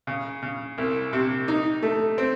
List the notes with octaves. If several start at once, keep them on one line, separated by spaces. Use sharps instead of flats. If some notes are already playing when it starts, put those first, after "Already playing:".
C#3
C#3
C2
C3
D#4
A3
C4